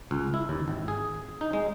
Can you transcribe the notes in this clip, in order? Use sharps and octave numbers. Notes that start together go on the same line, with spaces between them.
C#2
E4
D#2
G#1
G#4
D#4
G#3